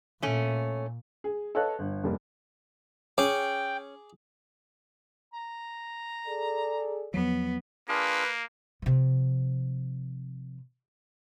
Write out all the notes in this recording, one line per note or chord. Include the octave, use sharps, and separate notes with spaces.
A#2 A3 C#4
G#4
A4 B4 C#5 D#5 F5 F#6
G1
F1 G3 A#3
C#4 G#4 G5 D6
A#5
G#4 A4 D5
E2 F3 F#3 B3
A#3 D4 F4 G#4 B4
C3 F3